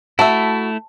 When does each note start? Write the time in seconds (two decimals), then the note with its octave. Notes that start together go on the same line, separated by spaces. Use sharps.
0.19 A3 E4 F#4 E5 A5